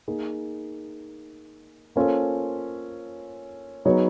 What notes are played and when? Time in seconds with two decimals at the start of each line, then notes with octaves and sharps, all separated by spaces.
0.08 A#3 D#4 G#4
1.96 A#3 C#4 F4 A4 C5
3.85 F#3 B3 D#4 G#4 C#5